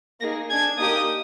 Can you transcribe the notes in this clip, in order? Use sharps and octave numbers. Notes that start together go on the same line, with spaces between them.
A#3 D#4 G#4 A#6
D4 G#4 G#6
A#3 D#4 G4 D#6